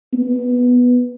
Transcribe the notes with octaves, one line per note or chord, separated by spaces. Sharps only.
B3